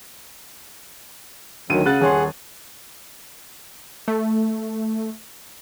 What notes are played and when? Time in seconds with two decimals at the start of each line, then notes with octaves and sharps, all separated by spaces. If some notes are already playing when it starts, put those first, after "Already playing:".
1.70 D2 D#3 F#3 D#7
1.86 C#3 F#5 F#6 A6
2.01 D#1 G#4 C#5 F#5 C6
4.08 A3